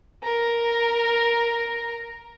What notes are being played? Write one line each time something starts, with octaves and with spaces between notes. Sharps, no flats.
A#4 A#5